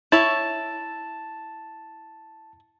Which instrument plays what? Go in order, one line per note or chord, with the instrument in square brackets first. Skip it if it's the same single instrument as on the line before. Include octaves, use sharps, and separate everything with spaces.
[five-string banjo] E4 C#5 E5 [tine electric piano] A5